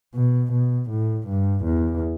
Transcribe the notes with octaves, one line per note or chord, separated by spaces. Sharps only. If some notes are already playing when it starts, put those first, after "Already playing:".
B2
B2
A2
G2
E2